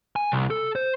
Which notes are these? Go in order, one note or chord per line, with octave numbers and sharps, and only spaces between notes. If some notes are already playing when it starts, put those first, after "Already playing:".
G#5
C2
A4
C5